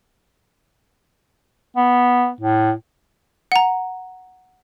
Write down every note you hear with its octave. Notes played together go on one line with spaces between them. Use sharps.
B3
A2
F#5 A#5